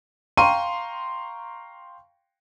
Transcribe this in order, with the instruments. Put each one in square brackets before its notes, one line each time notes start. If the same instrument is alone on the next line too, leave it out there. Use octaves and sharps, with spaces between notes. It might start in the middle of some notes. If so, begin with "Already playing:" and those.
[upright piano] F5 G5 A#5 C6 C#6 D#7